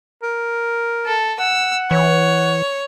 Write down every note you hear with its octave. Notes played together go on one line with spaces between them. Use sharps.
A#4
A4
F#5 E6
E3 C#5